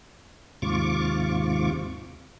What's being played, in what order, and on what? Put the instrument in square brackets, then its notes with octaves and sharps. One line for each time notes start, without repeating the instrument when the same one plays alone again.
[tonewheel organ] D#2 G#2 C3 F4 C#6 D6